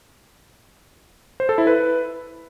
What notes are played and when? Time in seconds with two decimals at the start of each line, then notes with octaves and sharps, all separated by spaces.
1.40 C5
1.49 A4
1.58 E4
1.67 B4